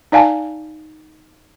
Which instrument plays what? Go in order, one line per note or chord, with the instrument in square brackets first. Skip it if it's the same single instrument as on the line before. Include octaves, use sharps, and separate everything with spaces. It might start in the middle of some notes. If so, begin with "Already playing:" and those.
[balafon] D#4 D5 F5 G#5 A5